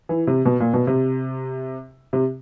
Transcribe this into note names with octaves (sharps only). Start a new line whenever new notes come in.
E3
C3
B2
A#2
B2
C3
C3